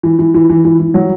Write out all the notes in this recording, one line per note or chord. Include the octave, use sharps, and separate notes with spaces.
E3
E3
E3
E3
E3
E3
F#3